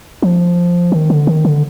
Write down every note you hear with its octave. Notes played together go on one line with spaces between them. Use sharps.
F3
D#3
D3
D#3
D3